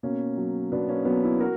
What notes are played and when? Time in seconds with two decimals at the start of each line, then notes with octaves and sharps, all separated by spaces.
0.03 B2 A#3 C#4
0.37 F#3
0.72 B2 B3 D4
0.89 A#3 C#4
1.05 F#3 B3 D4
1.23 C#4 E4
1.40 F#4 A#4